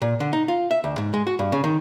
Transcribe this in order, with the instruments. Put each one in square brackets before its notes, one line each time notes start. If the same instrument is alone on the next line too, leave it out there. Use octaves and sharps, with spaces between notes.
[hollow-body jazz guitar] A#2
D3
D#4
F4
E5
D2
G#2
G#3
F#4
G2
C#3
D#3